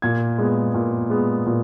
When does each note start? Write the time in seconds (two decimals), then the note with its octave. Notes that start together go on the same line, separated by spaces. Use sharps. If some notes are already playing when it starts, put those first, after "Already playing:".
0.02 A#2 G#6
0.38 G#3 B3
0.74 A#2
1.10 G#3 B3
1.46 A#2